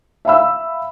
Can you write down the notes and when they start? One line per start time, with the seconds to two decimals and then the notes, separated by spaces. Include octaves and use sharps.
0.25 E5 F5 B5 E6